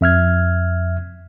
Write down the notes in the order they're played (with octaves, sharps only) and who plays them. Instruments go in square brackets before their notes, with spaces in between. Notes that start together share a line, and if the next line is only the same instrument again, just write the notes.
[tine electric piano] F2 E5 F6 G#6